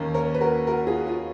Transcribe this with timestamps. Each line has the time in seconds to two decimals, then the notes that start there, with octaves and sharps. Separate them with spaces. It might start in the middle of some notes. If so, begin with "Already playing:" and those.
Already playing: D#2 D#3 A#3 C#4
0.14 A#4 C#5
0.34 B4
0.41 F#4 A#4
0.67 F#4 A#4
0.87 F4 G#4
1.07 F4